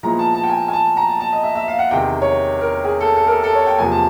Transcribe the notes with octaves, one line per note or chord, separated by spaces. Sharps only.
A#2 F3 G#3 B3 E4 A#5
A5
A5
G5
G#5
G#5
A5
A#5
A5
A5
D#5
E5
E5
F5
F#5
E2 C3 D#3 G5
C#5
A#4
G#4
A4
A4
A#4
A4
A4
C#5
G5
E2 C3 F3 A#3 G#5
A5